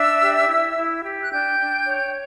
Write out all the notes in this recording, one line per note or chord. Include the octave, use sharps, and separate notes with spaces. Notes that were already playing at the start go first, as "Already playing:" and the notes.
Already playing: D4 E5 E6
G4
E4
E4
G4
F#6
D4 G5 G6
D4
C#5